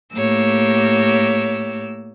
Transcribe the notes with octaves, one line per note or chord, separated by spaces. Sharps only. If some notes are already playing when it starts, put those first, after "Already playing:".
A2 A#3 G4 C#5 E6